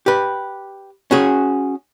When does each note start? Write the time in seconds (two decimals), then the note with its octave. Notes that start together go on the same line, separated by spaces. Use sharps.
0.06 G4 B4
1.11 C#4 F#4 G#4